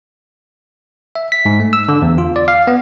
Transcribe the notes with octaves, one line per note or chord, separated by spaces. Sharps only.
E5
B6
G#2
A3
E6
D3
E2
F4
D5
F5
B3